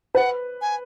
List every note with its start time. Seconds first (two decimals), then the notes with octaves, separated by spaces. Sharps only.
0.15 B4 F#5
0.61 G#5